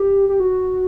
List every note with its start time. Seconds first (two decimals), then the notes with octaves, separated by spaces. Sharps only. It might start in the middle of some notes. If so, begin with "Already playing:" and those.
Already playing: G4
0.29 G4
0.40 F#4